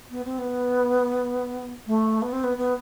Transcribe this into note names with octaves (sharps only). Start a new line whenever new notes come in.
B3
C4
B3
A3
B3
C4
B3
B3